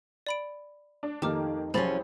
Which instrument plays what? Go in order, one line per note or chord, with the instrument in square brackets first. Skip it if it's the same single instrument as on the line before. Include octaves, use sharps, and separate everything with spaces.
[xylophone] D5 B5 D7
[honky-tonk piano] D4
[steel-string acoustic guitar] F2 [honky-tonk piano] D#3 A#3 [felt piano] D#4 [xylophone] G4 D6 F6
[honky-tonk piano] C2 [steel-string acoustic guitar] F3 F#3 C#4 [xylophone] G#4 B5 A6 [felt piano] C5